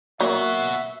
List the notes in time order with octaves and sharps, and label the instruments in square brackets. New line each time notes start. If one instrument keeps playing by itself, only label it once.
[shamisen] F#3 A#3 [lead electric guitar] B3 F#4 [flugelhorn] E5